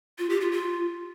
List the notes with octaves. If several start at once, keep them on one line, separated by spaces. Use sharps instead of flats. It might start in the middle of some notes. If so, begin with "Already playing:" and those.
F4
G4
F4
F4